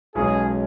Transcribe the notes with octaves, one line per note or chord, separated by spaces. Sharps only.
B1 B2 G#3 C#4 G#4